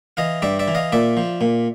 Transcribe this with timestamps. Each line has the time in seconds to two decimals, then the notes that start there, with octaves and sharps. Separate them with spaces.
0.17 E3 D#5 F5
0.42 G2 D5 E5
0.59 D5 E5
0.68 E3
0.75 D#5 F5
0.92 A#2 D5 E5
1.17 F3
1.41 A#2